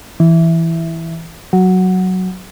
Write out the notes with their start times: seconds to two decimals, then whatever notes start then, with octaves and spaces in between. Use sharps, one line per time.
0.20 E3
1.53 F#3